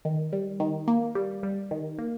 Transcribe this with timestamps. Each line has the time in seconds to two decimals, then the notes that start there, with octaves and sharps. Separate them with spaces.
0.05 D#3
0.33 G3
0.60 D#3
0.88 A#3
1.15 G3
1.43 G3
1.71 D#3
1.99 A#3